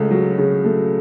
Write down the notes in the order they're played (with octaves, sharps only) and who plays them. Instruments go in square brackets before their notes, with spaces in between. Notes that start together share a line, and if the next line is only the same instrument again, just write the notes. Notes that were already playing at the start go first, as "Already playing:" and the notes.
Already playing: [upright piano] C#2 C#3 A3
F#3
C#3
A3